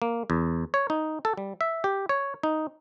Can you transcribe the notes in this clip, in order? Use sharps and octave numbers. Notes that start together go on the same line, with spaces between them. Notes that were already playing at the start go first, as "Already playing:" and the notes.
A#3
E2
C#5
D#4
A4
G3
E5
G4
C#5
D#4